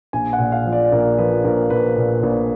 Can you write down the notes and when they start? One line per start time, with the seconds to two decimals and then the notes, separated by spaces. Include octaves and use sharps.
0.13 A#1 G#5
0.33 F#5
0.39 A#2
0.52 F5
0.66 F3
0.72 D5
0.92 A#1 A#4
1.18 F3 B4
1.44 A#1 A#4
1.70 A#1 B4
1.97 A#2
2.23 A#1